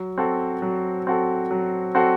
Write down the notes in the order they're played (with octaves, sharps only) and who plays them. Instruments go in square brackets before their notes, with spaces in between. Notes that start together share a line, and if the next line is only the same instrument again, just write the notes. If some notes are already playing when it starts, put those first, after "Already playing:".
Already playing: [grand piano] F#3
C4 F#4 A4
F#3
C4 F#4 A4
F#3
C4 F#4 A4